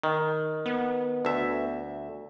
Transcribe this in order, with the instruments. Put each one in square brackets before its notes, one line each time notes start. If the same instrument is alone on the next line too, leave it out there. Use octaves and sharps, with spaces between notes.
[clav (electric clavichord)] D#3
[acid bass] B3
[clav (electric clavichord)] D2 E5